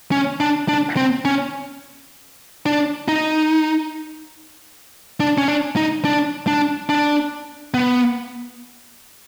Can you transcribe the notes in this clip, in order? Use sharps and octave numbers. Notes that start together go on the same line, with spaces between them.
C#4
D4
D4
C4
C#4
D4
D#4
D4
C#4
D4
D#4
D4
D4
D4
B3